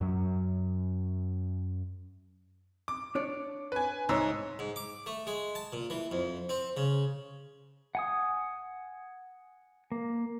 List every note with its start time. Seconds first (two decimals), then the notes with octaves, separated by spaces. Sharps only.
0.01 F#2 F#3
2.88 D6
3.15 D4 C#5 D5
3.72 B4 G#5
4.09 C2 G#2 C#5 E6
4.59 G#2
4.76 D6
5.06 A3
5.27 G#3
5.55 A5
5.73 A#2
5.90 E3
6.12 F2
6.49 C4
6.77 C#3
7.95 F#5 G#5 D#6
9.92 A#3